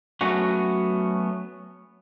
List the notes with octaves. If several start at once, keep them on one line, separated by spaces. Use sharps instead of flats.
F#3 A3 B3 C#4 F#4